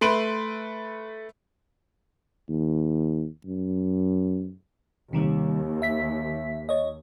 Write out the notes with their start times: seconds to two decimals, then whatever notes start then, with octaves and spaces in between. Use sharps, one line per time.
0.01 A3 B4 C6 D7 D#7 F#7
2.49 D#2
3.45 F#2
5.13 D#2 C3 D#3 G3
5.82 E5 B6
6.69 C#5 D#5